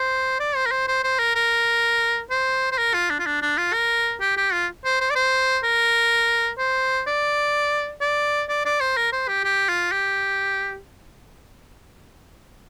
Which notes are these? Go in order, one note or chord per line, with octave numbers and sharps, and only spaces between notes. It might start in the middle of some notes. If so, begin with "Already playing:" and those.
Already playing: C5
D5
C5
A#4
C5
C5
C5
A#4
A#4
C5
C5
A#4
F4
D4
F4
D4
D4
F4
A#4
G4
G4
F4
C5
C5
D5
C5
A#4
C5
D5
D5
D5
D5
C5
A#4
C5
G4
G4
F4
G4